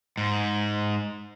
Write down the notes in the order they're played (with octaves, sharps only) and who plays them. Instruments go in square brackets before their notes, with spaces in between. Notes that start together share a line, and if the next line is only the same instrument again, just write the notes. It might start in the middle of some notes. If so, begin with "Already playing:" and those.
[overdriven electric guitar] G#2